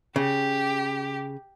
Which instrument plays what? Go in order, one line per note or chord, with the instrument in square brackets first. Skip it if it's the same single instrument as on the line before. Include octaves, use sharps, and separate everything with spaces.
[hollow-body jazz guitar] C#3 [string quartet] G4